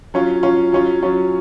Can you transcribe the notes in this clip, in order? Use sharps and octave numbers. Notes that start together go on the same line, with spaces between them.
F#3 C#4 F4
F#3 C#4 F4
F#3 C#4 F4
F#3 C#4 F4